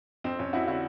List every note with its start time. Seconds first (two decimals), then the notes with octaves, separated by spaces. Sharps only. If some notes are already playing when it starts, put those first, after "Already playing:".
0.24 F2 C4
0.39 F2 C#4
0.53 F2 E4 F#4
0.68 D3 E4 F#4